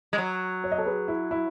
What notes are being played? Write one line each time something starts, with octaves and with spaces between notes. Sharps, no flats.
G#3
F#3
C#5
D#5
A4 C#5
G#4 B4
E4
E4